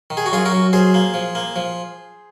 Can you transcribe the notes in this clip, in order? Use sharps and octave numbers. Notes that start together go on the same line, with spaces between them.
D#3
G#4
F#4
F#2 F4 G#4
F#4 A#4
F#2
F#2 G#4 C5
A#3
F3
A#3
F3